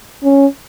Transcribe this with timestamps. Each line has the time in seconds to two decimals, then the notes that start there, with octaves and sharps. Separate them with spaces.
0.24 C#4